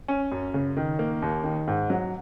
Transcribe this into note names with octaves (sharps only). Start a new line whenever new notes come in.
C#4
F#2
C#3
D#3
A#3
D#2
D#3
G#2
F#3